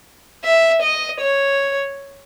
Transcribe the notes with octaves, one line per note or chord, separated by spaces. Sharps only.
E5
D#5
C#5